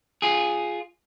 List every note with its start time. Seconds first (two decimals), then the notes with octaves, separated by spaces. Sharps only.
0.22 F4 G#4